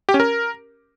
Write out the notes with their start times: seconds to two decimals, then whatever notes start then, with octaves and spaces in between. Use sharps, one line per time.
0.09 G4
0.14 C#4
0.20 A#4